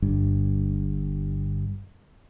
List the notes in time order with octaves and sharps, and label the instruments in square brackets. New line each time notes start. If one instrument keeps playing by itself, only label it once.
[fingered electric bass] G1 G2